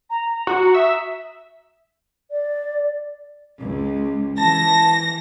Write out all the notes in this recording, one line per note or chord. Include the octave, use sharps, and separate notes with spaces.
A#5
F#4
A#5
E5 D#6
D5
C#2
E3 A5 A#6